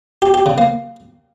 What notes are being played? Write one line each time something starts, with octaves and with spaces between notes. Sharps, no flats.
G4
G4
C#3
A#3